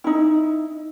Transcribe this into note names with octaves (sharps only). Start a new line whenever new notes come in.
D#4 E4